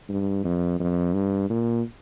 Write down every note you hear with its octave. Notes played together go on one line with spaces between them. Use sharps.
G2
F2
F2
G2
A#2